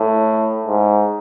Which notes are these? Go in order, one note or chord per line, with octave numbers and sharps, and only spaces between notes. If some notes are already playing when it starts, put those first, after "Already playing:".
Already playing: A2
G#2